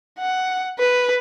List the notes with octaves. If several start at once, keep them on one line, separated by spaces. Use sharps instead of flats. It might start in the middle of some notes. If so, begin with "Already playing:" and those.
F#5
B4